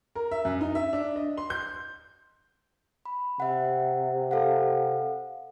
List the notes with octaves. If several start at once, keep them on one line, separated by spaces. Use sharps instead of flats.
A#4
E5
F#2
D#4
E5
D4
D#5
C6
G6
B5
C3 E5 F#5
A4 F5 F#5